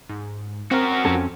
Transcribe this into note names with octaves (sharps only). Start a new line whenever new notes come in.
G#2
C4 F#4 A#4
F2 C#4 A4